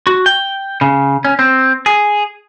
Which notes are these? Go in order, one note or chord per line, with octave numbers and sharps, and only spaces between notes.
F#4
G5
C#3
C#4
C4
G#4